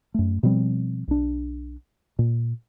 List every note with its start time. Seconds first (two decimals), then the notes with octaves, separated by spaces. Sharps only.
0.14 F#2 A3
0.43 B2 F3 G3 C4
1.08 B1 D4
2.19 A#2